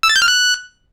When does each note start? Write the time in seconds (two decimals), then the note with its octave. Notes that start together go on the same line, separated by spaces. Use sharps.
0.03 E6
0.09 A6
0.16 G6
0.22 F6
0.28 F#6